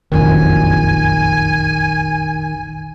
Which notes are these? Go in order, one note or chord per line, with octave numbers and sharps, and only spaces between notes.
F1 A#1 F#2 D#3 G#5